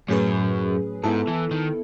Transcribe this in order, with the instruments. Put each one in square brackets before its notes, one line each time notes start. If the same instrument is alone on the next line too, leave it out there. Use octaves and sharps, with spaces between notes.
[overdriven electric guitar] F#2 [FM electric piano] A2 F#3 C#4 G#4 B4
[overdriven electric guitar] G#2 [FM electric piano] B3 E4 A4
[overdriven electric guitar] E3
D#3